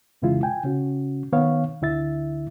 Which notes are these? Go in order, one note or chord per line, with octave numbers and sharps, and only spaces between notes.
F2 C#3 E3 G#3 E4 F4
G5 G#5
C#3 C#4 F#4
D#3 B3 C#5 F5
D2 D3 E4 E5 A6